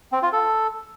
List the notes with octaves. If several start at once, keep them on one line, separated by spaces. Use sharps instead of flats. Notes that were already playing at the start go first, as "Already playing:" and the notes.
C4
F4
A4